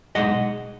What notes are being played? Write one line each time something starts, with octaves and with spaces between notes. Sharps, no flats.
B1 B2 G#3 D#4 D#5 F#5